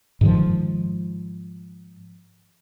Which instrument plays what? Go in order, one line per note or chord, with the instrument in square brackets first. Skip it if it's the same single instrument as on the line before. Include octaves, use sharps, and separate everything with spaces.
[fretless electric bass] G#2 D#3 F3